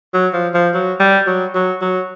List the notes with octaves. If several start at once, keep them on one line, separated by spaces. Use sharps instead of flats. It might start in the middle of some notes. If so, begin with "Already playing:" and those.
F#3
F3
F3
F#3
G3
F#3
F#3
F#3